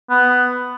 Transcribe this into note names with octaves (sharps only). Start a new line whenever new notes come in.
B3